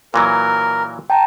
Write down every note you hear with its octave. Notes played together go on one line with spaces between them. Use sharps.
A#2 E3 F#3 A#4
G5 A5 A#5